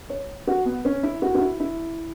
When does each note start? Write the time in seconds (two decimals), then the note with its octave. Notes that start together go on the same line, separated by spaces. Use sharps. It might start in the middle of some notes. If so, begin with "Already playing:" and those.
0.10 C#5
0.47 F#4
0.65 B3
0.85 C#4
1.03 E4
1.22 F#4
1.35 F#4
1.41 E4
1.60 E4